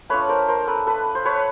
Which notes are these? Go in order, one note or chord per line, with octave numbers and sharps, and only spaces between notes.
A3 D4 F4 B4 C#5
A#4 C5
A#4 C5
A4 B4
A4 B4
C5
B4 C#5